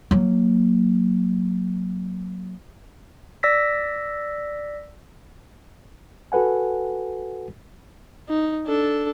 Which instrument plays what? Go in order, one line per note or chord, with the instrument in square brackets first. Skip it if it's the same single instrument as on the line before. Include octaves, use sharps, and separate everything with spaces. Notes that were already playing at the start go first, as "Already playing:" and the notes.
[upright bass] F#3 A#3
[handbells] D5 E6 A#6 B6
[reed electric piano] F#4 A4 B4 F#5 G#5
[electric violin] D#4
D4 A4